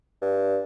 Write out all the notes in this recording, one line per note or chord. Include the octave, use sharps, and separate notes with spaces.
G2